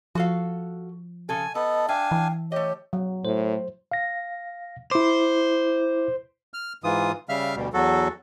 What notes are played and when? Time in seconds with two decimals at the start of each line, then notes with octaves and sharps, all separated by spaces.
0.15 F3 F#4 A4 F5
1.29 C#3 A4 G#5
1.55 B3 A4 D#5 A5
1.89 D4 E5 F5 G5 G#5
2.11 E3
2.52 A3 G4 C#5 D#5
2.93 F#3
3.25 A2 C5
3.91 F5 A#6
4.91 E4 C5 D6
6.54 F6
6.84 G#2 E3 F4 D#6
7.29 C#3 G3 E5 F5 F6
7.56 D2 B2 G3
7.74 E2 F#3 F#4 A4